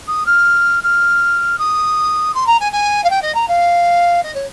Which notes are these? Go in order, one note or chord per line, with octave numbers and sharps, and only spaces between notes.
D#6
F6
F6
D#6
C6
A#5
G#5
G#5
F5
G5
D#5
A#5
F5
D#5
C#5